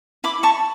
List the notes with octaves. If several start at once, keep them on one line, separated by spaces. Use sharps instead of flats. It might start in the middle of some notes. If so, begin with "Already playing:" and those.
E4 B5 D6
A5 C#6